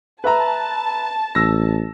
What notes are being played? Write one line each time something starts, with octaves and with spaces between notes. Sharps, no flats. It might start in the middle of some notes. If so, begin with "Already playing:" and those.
B4 E5 A5 A#5
A1 E6 A#6